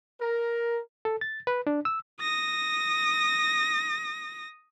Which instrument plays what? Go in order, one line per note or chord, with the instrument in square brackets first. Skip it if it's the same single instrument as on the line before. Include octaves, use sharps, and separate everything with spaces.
[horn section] A#4
[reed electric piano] A4
A6
B4
D4
E6
[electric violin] D#6 A#6